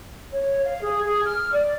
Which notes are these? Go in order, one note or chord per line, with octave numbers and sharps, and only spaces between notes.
C#5
F5
G#4
G#4
F6
D5